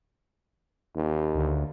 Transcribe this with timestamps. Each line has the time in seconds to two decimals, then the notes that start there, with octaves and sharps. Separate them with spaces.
0.96 D#2
1.35 D2